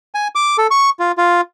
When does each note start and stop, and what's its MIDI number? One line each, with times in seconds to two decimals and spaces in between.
0.15 0.28 80
0.35 0.57 86
0.58 0.67 69
0.71 0.90 85
1.00 1.12 65
1.18 1.41 65